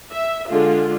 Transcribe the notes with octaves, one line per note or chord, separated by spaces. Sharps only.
E5
D3 G#3 F4